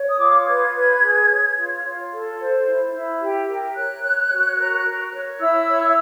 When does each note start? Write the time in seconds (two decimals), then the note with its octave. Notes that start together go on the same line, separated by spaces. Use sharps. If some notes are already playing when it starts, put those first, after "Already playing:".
Already playing: C#5
0.08 D#6
0.19 F4 D6
0.47 B4 G#6
0.75 B4
1.01 G#4
1.30 C#5
1.57 F4
1.83 F4
2.12 A4
2.39 C5
2.66 E4
2.94 E4
3.20 G4
3.48 A#4
3.75 C#5 F#6
4.03 C#5
4.30 F#4
4.59 A#4
4.86 A#4
5.13 C#5
5.40 E4 E6
5.68 C#5